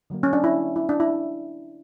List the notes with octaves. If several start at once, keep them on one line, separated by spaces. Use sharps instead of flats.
D3 F#3 A#3
C#4
D4
E4
E4
D4
E4